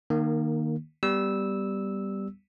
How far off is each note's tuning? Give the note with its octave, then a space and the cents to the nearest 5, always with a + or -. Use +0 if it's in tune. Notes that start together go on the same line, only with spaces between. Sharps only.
D#3 -20 A#3 +0
G3 +0 B3 +0 E6 -10